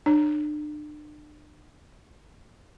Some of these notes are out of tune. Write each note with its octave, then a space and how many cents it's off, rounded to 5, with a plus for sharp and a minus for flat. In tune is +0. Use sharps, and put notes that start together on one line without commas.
D4 +35 C#5 +0